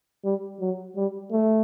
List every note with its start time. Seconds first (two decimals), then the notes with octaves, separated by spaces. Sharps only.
0.24 G3
0.60 F#3
0.96 G3
1.32 A3